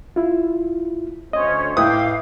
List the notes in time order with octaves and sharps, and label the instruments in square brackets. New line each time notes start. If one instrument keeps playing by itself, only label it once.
[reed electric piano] E4 F4
[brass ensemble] D2 C5 [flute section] C#4 C#5 [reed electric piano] D#5
[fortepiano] A2 B4 D#6 [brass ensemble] E5 G5 [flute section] F5 D6